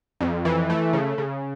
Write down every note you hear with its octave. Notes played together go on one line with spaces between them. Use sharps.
F2
E3
A3
C#3
C#3